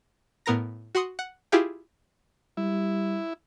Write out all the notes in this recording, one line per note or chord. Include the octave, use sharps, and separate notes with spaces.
A2 B3 A#4 A#5 A#6
F#4 F#5 C6 D#6 C#7
F#5
E4 F4 G4 G#4 F5 G5
G3 E4